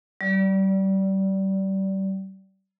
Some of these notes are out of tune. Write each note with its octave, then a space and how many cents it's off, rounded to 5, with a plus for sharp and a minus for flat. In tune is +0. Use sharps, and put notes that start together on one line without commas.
G3 -35 D5 -15